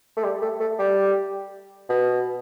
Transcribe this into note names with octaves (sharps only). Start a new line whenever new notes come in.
A3
G3
A3
A3
G3
B2